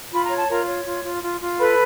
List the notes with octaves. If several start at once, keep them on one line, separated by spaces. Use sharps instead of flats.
F4 B5
A#5
C#5
A5
F4 A#4 A#5
C#5
F4
F4
F4
F4
A4 B4 B5